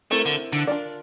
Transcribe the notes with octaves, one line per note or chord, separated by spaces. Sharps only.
A3 C4 E4 A#4
D3
D3
D4 F4 A#4 D5